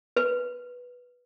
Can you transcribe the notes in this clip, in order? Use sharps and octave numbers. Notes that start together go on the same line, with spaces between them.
B4